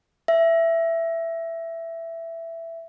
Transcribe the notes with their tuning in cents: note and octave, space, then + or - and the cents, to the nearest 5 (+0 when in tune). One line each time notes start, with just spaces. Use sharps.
E5 +10